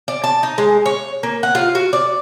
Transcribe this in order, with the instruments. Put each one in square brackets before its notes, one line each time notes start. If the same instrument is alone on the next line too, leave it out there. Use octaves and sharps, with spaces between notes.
[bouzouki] D5
A5
D#4
G#3
C#5
A#3
F#5
F4
F#4
D5